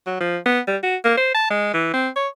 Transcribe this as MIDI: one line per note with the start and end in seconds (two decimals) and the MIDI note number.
0.07 0.18 54
0.21 0.38 53
0.46 0.60 59
0.67 0.77 55
0.83 0.97 66
1.04 1.16 58
1.18 1.30 72
1.35 1.45 81
1.50 1.70 56
1.74 1.90 52
1.94 2.09 60
2.16 2.28 73